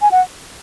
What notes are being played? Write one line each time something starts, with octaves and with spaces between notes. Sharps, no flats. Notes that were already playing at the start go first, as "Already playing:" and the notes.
G#5
F#5